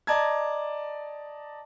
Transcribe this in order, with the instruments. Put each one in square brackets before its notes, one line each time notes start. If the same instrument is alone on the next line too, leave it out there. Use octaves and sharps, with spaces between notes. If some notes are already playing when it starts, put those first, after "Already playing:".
[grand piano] D5 D#5 A5 A#5 G#6